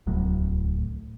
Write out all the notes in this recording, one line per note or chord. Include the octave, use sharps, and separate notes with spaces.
D1 C2 A2 F#3